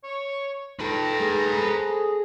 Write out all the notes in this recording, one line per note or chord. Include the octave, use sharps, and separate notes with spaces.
C#5
D#4 F4 A4 B4 G5 A#5
A3 D#4 G#4
A4 C5